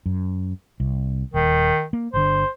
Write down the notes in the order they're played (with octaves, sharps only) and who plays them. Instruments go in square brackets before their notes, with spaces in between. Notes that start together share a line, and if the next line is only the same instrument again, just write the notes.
[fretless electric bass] F#2
C2
[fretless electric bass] D#1 [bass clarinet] D#3
[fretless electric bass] A#3
[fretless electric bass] G1 D3 [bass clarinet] C5